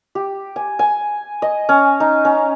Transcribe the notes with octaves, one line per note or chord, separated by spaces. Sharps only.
G4
G#5
G#5
D#5
C#4
D#4
C#4